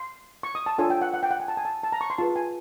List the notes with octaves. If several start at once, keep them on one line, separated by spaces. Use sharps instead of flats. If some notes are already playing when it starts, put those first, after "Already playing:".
Already playing: C6
C#6
D#6
A5
D4 F4 A4 C#5 G#5
G5
F#5
F#5
G5
F#5
G#5
A5
G#5
A5
A5
A#5
C#6
C6
F4 G#4 B4 A5
G#5